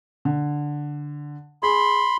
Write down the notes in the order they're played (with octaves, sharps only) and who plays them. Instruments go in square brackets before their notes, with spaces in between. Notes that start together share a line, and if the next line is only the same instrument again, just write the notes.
[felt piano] D3
[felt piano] G#4 [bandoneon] B5 C6